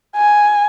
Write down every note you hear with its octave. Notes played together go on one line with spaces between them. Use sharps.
G#5